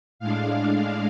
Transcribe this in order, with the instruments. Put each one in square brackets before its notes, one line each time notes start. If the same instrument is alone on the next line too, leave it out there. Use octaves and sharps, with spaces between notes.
[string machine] A2 G#3 D4 F5